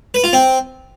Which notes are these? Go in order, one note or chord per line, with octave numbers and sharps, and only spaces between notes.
B4
F4
C4